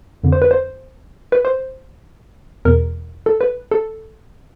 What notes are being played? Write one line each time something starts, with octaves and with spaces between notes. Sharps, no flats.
F2 D3
C5
B4
C5
B4
C5
E2 B2 A#4
A4
B4
A4